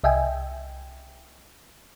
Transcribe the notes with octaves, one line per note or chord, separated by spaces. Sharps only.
C2 D#5 E5 G5 G#5